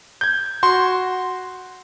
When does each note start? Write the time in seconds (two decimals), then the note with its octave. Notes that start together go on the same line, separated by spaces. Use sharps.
0.21 G6 G#6
0.63 F#4 C6